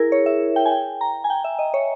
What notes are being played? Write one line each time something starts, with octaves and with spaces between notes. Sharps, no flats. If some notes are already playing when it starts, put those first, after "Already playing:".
Already playing: E4 G#4 A#4
C#5
E5
G5
G#5
G5
A#5
G#5
G5
E5
D#5
C#5